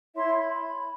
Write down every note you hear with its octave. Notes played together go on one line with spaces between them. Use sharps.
E4 C#5 E5 C6
B5